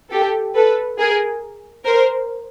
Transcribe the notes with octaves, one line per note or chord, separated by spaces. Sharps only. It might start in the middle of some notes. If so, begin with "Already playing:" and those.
G4 A4
A4 B4
G#4 A#4
A#4 C5